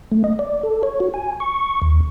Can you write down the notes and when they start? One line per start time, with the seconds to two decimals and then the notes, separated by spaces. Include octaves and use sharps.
0.11 A3
0.24 D#5
0.39 D5
0.63 A4
0.83 C#5
1.00 F#4
1.14 G#5
1.40 C#6
1.82 D#2